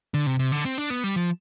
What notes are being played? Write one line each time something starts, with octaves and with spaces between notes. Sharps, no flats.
D3
C3
C3
D3
C4
D4
B3
G3
F3